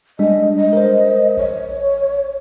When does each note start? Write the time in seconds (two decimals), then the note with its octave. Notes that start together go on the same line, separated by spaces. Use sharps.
0.19 G3 G#3 D4 D#5
0.57 D#5
0.73 A#4 C5
1.37 A#1 C#5